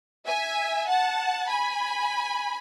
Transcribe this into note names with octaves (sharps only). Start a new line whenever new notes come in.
E5 G#5
F#5 A5
G#5 B5